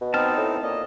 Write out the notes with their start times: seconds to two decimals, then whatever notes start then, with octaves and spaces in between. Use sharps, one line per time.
0.01 B2
0.14 B3 C4 D#4 A5 F6
0.37 A2
0.63 A#2 A#3 D#5